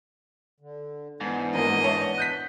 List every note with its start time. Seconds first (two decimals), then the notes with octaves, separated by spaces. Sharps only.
0.60 D3
1.21 G#2 E3 B3 D4
1.55 G#1 A#3 D#5
1.84 C#5 E5 A5
2.18 F#6 G6 B6